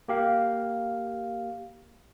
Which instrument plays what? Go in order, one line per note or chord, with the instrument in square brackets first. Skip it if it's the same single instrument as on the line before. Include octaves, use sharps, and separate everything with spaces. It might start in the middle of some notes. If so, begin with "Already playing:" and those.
[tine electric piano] A#3 G4 F5